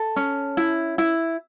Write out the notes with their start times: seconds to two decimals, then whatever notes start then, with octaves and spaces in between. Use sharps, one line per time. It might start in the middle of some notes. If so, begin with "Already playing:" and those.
Already playing: A4
0.16 C#4
0.57 E4
0.98 E4